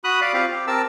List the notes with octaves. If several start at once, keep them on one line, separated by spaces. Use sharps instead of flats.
F#4 B5 D#6 F#6
D5 F5 B5
C4 F4 G4 F5
G4
C4 A#4 A5 E6